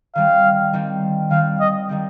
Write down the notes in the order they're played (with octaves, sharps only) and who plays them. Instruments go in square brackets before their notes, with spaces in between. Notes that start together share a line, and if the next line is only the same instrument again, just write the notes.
[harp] D#3 G3 C4 [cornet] F5
[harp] D#3 G3 C4
[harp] D#3 G3 C4 [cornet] F5
[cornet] D#5
[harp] D#3 G3 C4